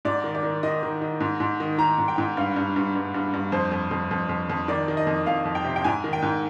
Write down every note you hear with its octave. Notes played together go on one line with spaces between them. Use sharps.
G#2 D5
D#3
D5
D#3
D#3 D#5
D#3
D#3
G#2
G#2
D#3
D#3 A#5
G#2
G5
G#2
G2 F5
G2
G2
G2
G2
G2
F2 C5
F2
F2
F2
F2
F2
D#3 D5
D#3
D#5
F2
F2 F5
F2
G5
C3
G5
G#2 G#5
D#3
G5
G#2